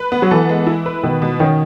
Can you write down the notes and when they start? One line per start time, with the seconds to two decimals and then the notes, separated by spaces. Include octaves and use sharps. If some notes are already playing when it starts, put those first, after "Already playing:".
Already playing: B4
0.12 B3
0.22 F#3
0.31 E3 A4
0.49 G#3
0.67 E4
0.86 B4
1.03 B2 D#3
1.22 B2
1.39 D#3 C#4